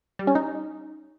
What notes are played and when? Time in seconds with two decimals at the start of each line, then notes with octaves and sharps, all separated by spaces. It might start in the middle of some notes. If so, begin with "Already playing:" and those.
0.19 G3
0.27 C#4
0.35 D#4